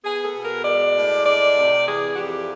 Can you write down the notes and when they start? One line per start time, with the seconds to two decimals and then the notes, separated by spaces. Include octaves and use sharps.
0.04 B3 G#4
0.25 A4
0.35 B2
0.45 A#4
0.65 G#3 D5
0.96 A2
1.26 G#3 D5
1.57 C3
1.87 E3 G#4
2.13 F#4
2.18 F2 G4